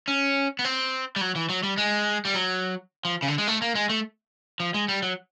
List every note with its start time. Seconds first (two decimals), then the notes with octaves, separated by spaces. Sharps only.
0.08 C#4
0.59 B3
0.65 C4
1.16 G3
1.21 F#3
1.35 E3
1.49 F#3
1.63 G3
1.78 G#3
2.25 G3
2.34 F#3
3.05 F3
3.22 C#3
3.28 D3
3.38 G#3
3.48 A3
3.62 A#3
3.75 G#3
3.89 A3
4.60 F3
4.74 G#3
4.88 G3
5.02 F#3